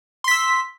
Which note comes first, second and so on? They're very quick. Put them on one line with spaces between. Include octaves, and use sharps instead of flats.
C6 B6 E6